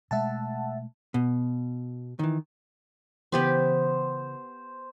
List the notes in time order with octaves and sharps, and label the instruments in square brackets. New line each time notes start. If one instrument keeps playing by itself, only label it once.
[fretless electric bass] B2 G#3 A3 [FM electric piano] E5 F#5 A5
[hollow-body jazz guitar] B2
D#3 E3
[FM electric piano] C#3 E3 [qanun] B3 G4 B4 [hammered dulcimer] C5